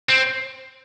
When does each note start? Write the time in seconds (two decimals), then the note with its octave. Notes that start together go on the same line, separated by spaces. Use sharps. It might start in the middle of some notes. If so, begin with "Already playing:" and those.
0.09 C4